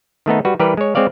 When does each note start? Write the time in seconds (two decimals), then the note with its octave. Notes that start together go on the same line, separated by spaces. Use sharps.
0.26 D#3 A3 B3 D#4
0.45 G3 F#4 B4
0.60 E3 G3 G4 A#4 B4
0.77 G#3 C#5
0.95 G#3 C4 C#5 D5 F5